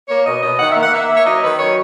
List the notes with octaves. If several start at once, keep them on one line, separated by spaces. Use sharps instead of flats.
A#3 C#5
B2 D#5
B2 D#5
D#3 F#5
E5
A#3 F#5
A#3 E5
A#3
C#5
F#3 D#5
D#3 B4
F#3 C#5